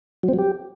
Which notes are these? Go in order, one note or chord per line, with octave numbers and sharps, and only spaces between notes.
F#3
C4
F#3
G4